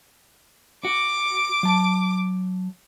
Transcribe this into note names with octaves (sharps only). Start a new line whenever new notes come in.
F#4 D6
F#3 A5